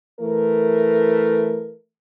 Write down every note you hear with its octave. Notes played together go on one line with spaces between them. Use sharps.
E3 A3 A#4